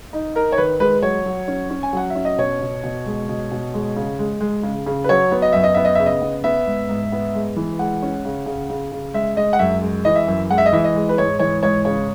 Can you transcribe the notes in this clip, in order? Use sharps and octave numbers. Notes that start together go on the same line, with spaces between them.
D#4
D#4 A#4
C#5
D#3 B4
G#3 B4
F#3 C#5
F#3
C#4
C#4
G#5
F#3 F#5
E5
C#4
D#5
B2 C#5
B2
B2
G#3
B2
B2
G#3
C#3
G#3
G#3
C#3
C#3
B4
F#3 C#5
B3
D#5
F#2 E5
D#5
B3 E5
D#5
C#3 E5
D#5
B3
B3 E5
G#2
G#2
B3
G#3
E3
G#3 F#5
C#4
C#3
C#3
C#3
C#3
G#3 E5
G#3 D#5
F#5
F#2 E5
G#3
E3 D#5
E5
F#2
G#3 F#5
E5
D#5
E3 E5
D#5
G#3
B4
G#2 C#5
E3 C#5
G#2 C#5
C#3 C#5